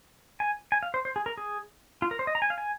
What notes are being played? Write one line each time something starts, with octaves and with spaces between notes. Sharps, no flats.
G#5
G#5
F5
C5
C5
G#4
A#4
G#4
F4
A#4
C5
D#5
A#5
G#5
F5
G#5